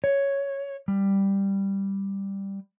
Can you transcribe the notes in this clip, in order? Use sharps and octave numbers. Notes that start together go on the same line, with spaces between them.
C#5
G3